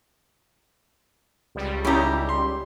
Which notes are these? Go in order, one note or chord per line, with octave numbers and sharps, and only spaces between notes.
C#2 G3
C#4 D#4 E4 G4 A#5
C6